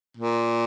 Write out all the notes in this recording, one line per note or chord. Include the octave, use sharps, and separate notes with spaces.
A#2